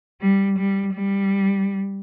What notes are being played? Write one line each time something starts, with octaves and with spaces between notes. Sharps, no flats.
G3
G3
G3